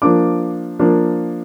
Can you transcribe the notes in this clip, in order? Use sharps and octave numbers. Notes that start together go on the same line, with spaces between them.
F3 A#3 D4 D6
F3 A#3 D4